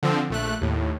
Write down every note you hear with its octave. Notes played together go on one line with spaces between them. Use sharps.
D3 F3 C4
A#1 A3 F#6
D#2 A2